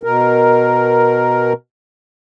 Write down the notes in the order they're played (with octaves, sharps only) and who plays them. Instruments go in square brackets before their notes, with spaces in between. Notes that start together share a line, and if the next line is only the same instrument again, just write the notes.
[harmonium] B2 A#4